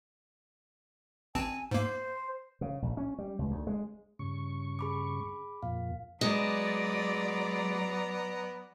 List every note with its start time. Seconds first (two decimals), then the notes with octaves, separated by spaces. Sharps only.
1.35 A1 C4 G#5 A5
1.71 G#2 A#3 C5
2.61 C#3
2.82 A#1
2.97 C#4
3.19 G3
3.39 C#2
3.51 D2
3.67 G#3
4.19 G2 C#3 C#6
4.79 G#4 B5 D6
5.63 F2 A#2 F5
6.21 F#3 G#3 B3 D5 A#5